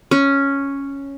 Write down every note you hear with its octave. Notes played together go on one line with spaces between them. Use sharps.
C#4